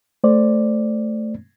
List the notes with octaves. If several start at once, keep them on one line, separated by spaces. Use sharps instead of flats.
A3 C5 D5